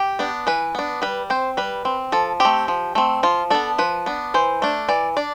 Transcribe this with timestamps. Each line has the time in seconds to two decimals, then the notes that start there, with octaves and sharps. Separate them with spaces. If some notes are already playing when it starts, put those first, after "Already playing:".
Already playing: G4
0.19 B3 D4
0.47 E3 B4
0.75 B3 D4
1.02 G3 B4
1.30 C4 C5
1.57 G3 B4
1.85 C4
2.12 F3 A4
2.40 A3 C4 G4
2.68 F3
2.95 A3 C4
3.23 F3 F4
3.50 B3 D4 A4
3.78 F3 B4
4.06 B3 D4
4.34 E3 C5
4.62 A3 D4
4.89 E3 D5
5.17 D4 D5